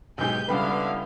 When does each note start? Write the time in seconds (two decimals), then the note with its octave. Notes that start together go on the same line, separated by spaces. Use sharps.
0.18 B1 G#2 G4 G#5 G6
0.48 C#2 D3 G3 B3 E4 B4 F5